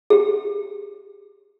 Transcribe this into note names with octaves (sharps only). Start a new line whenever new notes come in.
G4 G#4